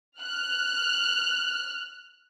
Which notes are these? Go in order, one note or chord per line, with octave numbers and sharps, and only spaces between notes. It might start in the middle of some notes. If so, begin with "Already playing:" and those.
F6 F#6